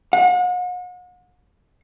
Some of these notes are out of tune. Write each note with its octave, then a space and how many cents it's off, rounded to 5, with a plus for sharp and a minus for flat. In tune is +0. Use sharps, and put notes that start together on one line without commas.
F#5 -40